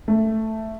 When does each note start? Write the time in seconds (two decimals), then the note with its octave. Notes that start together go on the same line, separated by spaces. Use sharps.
0.08 A3